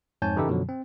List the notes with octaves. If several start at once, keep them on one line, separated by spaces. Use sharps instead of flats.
F2 G#2 C#5 G#5 A5 G6
C#3 E3 D#4 E4 G4 A4
F#2 B2 D3 F3 F#3
C4